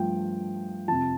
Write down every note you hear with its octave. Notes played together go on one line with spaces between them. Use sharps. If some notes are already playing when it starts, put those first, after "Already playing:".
Already playing: G2 F3 A3 G5
F2 C3 F3 A5